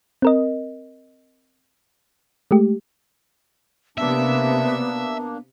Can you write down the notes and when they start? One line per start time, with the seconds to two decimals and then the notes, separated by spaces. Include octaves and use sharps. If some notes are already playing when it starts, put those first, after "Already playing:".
0.22 C4 A#4 D#5
2.51 G#3 A3 G4
3.98 C3 A#3 B3 D4 E5